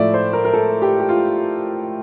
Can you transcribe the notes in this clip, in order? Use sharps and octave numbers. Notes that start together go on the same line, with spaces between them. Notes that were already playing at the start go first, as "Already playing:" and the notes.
Already playing: A2 F3 A3 D5 E5
C5
A#4
A#4
A4
G4
G4
F4